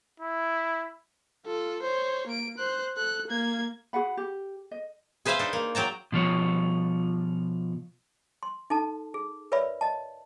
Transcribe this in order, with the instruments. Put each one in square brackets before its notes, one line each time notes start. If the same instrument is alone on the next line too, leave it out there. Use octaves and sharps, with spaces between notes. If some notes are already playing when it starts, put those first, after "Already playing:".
[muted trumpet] E4
[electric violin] F4 A4
C5 C#5
A#3 D7
C5 F#6
A4 F#6
A#3 G#6
[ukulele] F#4 G#4 F#5 B5
G4
D#5
[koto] G#4 B4 C5 E5 F5 G#5
D4 D#4
A#3
F#3 G5 A5 A#5
[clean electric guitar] B2 F3 F4 C#5
[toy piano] C6
D#4 A4 A5
G#4
A#4 B4 C#5 D5 E5 B5
D#5 A5